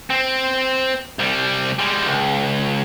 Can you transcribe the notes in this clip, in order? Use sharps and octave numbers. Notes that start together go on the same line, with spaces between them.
C4
C2 G3
G3 G#3
C#2